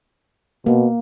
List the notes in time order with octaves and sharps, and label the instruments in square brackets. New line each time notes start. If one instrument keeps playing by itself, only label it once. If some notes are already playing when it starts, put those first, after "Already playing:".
[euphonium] B2 [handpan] A#3